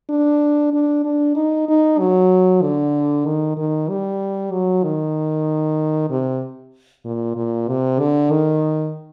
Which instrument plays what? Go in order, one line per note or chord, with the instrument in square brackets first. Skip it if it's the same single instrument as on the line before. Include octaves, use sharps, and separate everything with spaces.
[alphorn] D4
D4
D4
D#4
D#4
F#3
D3
D#3
D#3
G3
F#3
D#3
C3
A#2
A#2
C3
D3
D#3